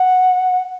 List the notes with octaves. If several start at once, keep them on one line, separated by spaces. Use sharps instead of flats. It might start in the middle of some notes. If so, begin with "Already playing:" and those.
Already playing: F#5